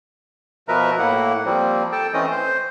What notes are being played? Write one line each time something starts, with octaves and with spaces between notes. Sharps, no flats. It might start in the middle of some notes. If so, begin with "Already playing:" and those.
B2 F3 A#4 B4 E5 A#5
A2 A#3 E4 F#5
F3 G3 A#3 C4
A4 G5 A5
E3 A3 C4 C#4 D#5 D#6
C5